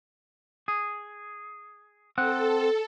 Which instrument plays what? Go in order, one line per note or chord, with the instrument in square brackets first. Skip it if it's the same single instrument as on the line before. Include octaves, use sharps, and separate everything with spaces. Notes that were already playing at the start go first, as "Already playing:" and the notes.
[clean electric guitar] G#4
[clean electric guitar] C4 F#5 [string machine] A4